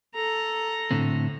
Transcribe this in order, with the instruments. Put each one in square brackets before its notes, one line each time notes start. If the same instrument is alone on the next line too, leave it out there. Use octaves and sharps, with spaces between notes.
[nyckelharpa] A4 A#5
[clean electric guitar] A2 D3 C4